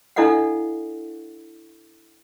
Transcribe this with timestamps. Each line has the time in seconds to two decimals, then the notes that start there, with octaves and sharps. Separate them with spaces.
0.16 D4 E4 A4 D#5 F5 F#5